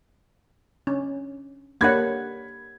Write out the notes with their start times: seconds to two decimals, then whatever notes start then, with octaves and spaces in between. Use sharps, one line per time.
0.87 C#4 D4
1.81 A#3 D4 G4 A#4 C#5 F#5 B5 G#6